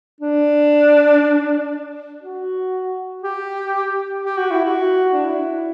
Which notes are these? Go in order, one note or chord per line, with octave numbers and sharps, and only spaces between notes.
D4
F#4
G4
G4
F#4
E4
F#4
D4
E4